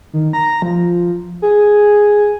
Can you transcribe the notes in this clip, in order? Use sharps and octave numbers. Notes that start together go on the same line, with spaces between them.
D#3
A#5
F3
G#4